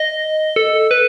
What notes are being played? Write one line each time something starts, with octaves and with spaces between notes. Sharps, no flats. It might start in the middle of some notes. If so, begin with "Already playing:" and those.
Already playing: D#5
A4
B4